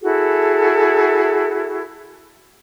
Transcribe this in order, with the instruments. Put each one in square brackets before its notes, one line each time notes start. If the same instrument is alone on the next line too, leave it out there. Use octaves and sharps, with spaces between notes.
[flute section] E4 F#4 G#4 A4